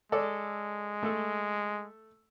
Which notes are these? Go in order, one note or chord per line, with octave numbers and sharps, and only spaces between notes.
G#3 A4 D5
A3 A4